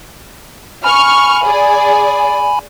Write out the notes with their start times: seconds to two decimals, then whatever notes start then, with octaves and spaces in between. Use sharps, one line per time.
0.84 G#5 B5 C#6 F6
1.45 G#4 D5